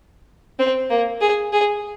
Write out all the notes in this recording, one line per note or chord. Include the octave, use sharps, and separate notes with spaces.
C4
A#3
G#4
G#4